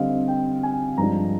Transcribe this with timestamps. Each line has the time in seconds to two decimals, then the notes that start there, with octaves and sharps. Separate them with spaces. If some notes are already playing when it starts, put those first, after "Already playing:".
Already playing: D3 G3 C4 D#5 F5
0.28 G5
0.63 G#5
0.98 G2 F3 G#3 D4 A#5